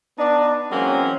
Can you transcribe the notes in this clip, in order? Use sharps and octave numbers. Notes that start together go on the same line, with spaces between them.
B3 D4 D#4 D5
E3 F#3 G#3 A#3 C4 C#4